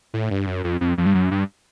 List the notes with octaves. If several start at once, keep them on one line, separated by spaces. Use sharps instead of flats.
A2
G2
F#2
F2
F2
F2
G2
F#2
G2